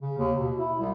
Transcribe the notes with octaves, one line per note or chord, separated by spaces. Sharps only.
C#3
D#2
B2
E4
C2